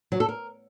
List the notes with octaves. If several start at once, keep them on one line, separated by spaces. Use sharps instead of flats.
F#3
A4
A#4